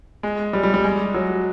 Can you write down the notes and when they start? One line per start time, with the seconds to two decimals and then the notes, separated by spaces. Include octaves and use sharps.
0.23 G#3
0.53 G3
0.63 G3
0.74 G3
0.84 G#3
1.14 F#3